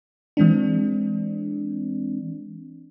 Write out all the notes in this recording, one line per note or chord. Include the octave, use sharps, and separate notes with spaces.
E3 G#3 C4 D4